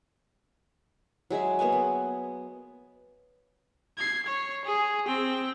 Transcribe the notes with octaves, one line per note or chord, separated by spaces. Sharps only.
F#3 G#3 G#4 E5
A#3 B3 F#5 G#5
B3
G#6 C7
C#5
G#4
C4 G5